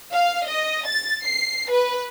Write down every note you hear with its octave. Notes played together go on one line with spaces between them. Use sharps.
F5
D#5
A6
C7
B4